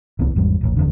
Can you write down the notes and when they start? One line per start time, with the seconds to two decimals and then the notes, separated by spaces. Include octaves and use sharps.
0.19 D1 C2 E3 B3
0.35 G#1 E2 G#2 G3
0.61 D#1 A1
0.77 F1 E2 D3